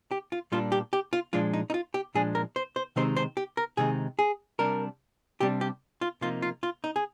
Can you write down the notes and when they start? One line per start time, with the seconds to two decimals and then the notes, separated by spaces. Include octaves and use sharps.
0.11 G4
0.32 F4
0.52 A#2 G3 A#3 D4 F4
0.72 G4
0.93 G4
1.13 F4
1.33 A#2 F3 G#3 D4 F4
1.54 D#4
1.70 D#4
1.74 F4
1.94 G4
2.15 A#2 F3 G#3 D4 G#4
2.35 A#4
2.56 C5
2.76 C5
2.96 C3 D#3 G#3 C4 D#4 C5
3.17 C5
3.37 G4
3.57 A#4
3.77 C3 D#3 G#3 C4 D#4 G#4
4.19 G#4
4.59 C3 G3 D4 A#4
5.40 C3 G3 D4 G4
5.61 G4
6.01 F4
6.21 C3 F3 A#3 D#4 F4
6.42 F4
6.63 F4
6.84 D#4
6.96 G#4